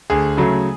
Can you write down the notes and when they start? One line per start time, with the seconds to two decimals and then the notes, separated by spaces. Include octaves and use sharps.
0.10 D2 G#4
0.37 C#3 F#3 A3